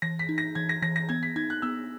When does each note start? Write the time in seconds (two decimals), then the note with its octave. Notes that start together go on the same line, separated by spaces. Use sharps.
0.02 E3 A#6
0.19 B6
0.29 D#4
0.38 A#6
0.55 E3 G#6
0.69 A#6
0.82 E3 A#6
0.96 A#6
1.09 B3 G#6
1.23 B6
1.36 D#4 G#6
1.50 F#6
1.62 B3 E6